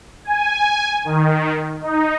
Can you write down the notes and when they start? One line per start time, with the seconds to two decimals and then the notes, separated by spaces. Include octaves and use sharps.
0.25 G#5
1.05 D#3
1.81 D#4